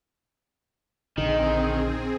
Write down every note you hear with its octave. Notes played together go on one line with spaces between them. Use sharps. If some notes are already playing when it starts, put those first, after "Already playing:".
A#1 D3 D#3 C4 G#4 D#5